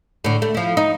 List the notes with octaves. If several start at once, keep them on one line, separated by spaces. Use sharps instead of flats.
A2 D3
A3
F3 E4
D#4